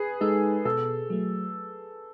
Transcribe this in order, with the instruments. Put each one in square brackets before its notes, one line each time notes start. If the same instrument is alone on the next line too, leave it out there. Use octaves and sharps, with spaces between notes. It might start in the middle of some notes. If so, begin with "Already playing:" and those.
Already playing: [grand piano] G#4 B4
[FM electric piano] G#3 D#4 [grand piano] A4
[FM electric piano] B2 [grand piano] A4
[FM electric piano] F#3 A3